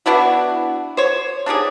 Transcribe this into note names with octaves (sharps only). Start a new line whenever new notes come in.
B3 D4 E4 F#4
C5 C#5
D4 D#4 G4 G#4